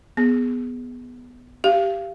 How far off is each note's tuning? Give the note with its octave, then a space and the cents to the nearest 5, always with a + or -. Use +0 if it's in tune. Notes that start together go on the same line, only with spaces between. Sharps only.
B3 +0 G#4 +0
G4 +0 F5 -25